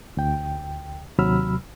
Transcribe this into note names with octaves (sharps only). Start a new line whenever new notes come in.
D2 G5
D#2 C3 F#3 B5 E6 F6